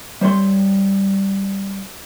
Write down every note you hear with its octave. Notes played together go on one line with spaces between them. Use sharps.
G3 C5 C#5 C6